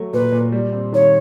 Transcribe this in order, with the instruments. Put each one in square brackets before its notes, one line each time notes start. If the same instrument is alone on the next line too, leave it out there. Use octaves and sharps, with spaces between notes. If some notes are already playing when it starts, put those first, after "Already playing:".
Already playing: [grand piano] F#3 A3
[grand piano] A#2 [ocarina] B4
[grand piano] A#2
G3
C4
[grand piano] D#3 [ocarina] C#5